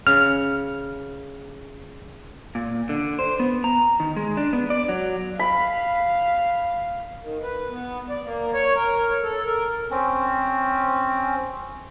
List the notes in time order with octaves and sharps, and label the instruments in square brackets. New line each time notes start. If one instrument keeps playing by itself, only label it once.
[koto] C#3 [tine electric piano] F6
[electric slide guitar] A#2
D3
C5
B3
A#5
D#3
G#3
D4
B3
D5
F#3
[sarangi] F5 [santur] B5
[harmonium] D#3
B4
B3
D5
A#3
C#5
A#4
C#5
A4
A#4
[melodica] C4 C#4